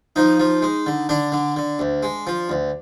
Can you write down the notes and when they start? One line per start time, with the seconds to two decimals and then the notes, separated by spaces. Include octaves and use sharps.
0.16 F3 D#4
0.40 F3
0.62 G#3
0.86 D3
1.09 D3 D4
1.32 D3
1.56 D3
1.79 D2
2.03 G#3
2.27 F3
2.49 D2